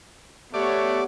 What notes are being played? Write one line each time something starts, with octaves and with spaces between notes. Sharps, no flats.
A3 B3 G4 C#5 D5 F#5